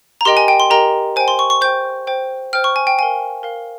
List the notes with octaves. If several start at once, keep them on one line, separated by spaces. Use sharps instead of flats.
A#5
G4 A#4 D#5 G5 C6
G#5
G5
C6
G4 A#4 D#5 G5 A#5
C5 G5 G#5
C6
C#6
C#6
C5 G5 G6
C5 G5
C5 G5 F6
C#6
G#5
G5
A#4 F5 G#5
A#4 F5